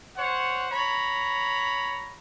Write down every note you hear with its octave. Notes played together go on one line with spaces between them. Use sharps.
C5 C#5 F#5
C#5 A#5 B5